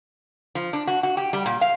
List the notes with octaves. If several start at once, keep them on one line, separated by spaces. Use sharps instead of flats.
F3
D4
F#4
F#4
G4
G3
A#2
F5